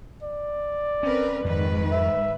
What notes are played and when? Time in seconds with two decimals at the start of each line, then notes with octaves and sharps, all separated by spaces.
0.23 D5
1.03 C4 C#4 A#4 B4
1.45 F2 G#2 D#3 B4
1.92 E5